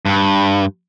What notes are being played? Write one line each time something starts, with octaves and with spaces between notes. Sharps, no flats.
G2